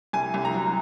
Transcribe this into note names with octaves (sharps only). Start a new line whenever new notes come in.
C2 G#5
C2
A#5
F#3